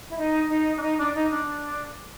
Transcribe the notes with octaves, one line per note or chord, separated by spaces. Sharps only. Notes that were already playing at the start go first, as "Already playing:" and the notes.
E4
D#4
D#4
D4
D#4
D4
D#4
D4